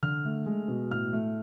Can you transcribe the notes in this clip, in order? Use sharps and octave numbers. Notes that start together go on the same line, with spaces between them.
D3 F6
A3
G#3
B2
A2 F6
A3